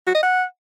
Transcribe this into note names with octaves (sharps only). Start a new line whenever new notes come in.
F#4
D#5
F#5